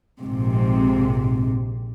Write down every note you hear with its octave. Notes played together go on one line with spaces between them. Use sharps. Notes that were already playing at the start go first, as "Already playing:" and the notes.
A#1 G#2 C3